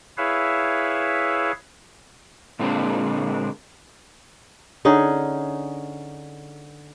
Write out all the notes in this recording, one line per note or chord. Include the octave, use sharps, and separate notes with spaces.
E4 G#4 B4 C#5 E5 F5
A#2 D3 G#3 A#3 C4 D4
D3 C#4 D#4 G#4